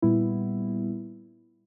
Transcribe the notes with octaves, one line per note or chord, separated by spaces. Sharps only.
A#2 G3 B3 E4